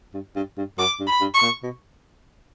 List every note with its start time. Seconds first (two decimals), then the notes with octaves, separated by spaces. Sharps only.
0.14 G2
0.36 G2
0.57 G2
0.78 F#2 D6
1.00 G2
1.07 B5
1.21 G2
1.34 C#6
1.42 A#2
1.63 B2